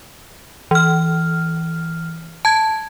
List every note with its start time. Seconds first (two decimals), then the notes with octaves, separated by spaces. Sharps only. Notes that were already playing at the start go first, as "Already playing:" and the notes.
0.71 E3 F6
2.45 A5 G#6